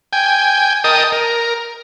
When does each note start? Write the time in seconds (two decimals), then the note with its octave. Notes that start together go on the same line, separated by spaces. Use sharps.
0.13 G5 G#5
0.84 A#4 D#5 G5 A5 D#6
1.12 A#4